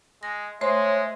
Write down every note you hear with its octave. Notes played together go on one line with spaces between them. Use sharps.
G#3 A#6
G#3 A3 C5 C#5 E5 C6